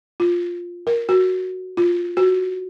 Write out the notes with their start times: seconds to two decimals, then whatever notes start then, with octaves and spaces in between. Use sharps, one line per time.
0.20 F4
0.87 A#4
1.09 F#4
1.77 F4
2.17 F#4